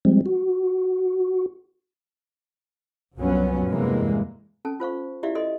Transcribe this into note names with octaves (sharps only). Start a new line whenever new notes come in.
F3 G3 G#3 C4
F#4
C2 F#2 F3 F#3 B3 C#4
E2 G2 C3 E3 G#3 A#3
C#4 A4 A5
F4 C5 F5 C#6
E4 G4 D5 E5 F5
A4 D#5 C6